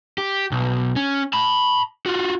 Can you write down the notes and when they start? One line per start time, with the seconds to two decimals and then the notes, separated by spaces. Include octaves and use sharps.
0.18 G4
0.51 B1
0.96 C#4
1.33 A5 B5
2.06 F4 F#4